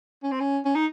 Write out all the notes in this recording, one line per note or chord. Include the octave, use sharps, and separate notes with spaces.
C#4
C4
C#4
C#4
D#4